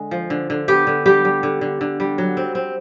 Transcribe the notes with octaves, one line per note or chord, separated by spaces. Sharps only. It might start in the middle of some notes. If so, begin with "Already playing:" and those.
Already playing: D3 G#3
F3
D3
D3
B3 G4
D3
G3 G4
G3
D3
D3
D3
G3
F#3
C4
C4